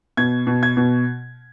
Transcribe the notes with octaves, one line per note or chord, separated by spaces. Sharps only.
B2 G#6
B2
G#6
B2